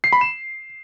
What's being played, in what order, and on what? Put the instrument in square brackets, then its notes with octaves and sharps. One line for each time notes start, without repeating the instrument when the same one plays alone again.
[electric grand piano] C7
B5
E7